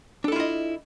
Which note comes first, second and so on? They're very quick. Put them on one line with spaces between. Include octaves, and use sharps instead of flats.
D4 A4 E4 F4 D#5